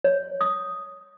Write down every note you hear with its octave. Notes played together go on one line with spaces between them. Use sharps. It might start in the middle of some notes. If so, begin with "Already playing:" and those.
C#5
D#6